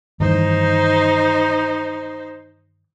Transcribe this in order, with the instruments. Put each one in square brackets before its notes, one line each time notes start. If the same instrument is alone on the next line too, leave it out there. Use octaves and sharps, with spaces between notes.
[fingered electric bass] G2 D#3 E3 [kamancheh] D#4 C5